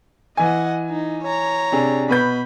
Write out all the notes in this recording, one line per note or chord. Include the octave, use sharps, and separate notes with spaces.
E3 D#5 F#5 G#5
D#4
C#5 A#5
C3 D4 G#4
B2 B4 B5 G6